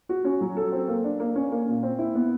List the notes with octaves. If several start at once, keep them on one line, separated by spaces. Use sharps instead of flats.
F#4
C#4
F#3
A4
C4
A#3
D4
A#3
C#4
A#3
A#2
C4
E4
B3